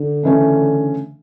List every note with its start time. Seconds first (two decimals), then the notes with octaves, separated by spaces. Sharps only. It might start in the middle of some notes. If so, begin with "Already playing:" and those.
Already playing: D3
0.23 C#3 E3 A3 C#4